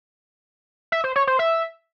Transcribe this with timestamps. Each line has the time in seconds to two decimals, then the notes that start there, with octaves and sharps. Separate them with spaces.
0.92 E5
1.04 C5
1.16 C#5
1.27 C5
1.39 E5